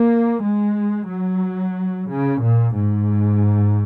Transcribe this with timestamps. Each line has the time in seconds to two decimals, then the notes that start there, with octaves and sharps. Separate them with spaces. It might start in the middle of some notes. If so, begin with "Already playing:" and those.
Already playing: A#3
0.42 G#3
1.08 F#3
2.08 C#3
2.40 A#2
2.73 G#2